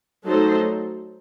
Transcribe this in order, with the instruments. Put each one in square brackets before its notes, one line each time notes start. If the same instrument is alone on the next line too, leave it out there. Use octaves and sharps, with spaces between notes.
[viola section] F#3 A3 D#4 A4 C5